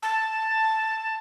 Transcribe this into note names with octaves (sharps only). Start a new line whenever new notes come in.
A5